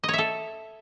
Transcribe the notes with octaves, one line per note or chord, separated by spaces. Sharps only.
A4 C#5 D#5 E5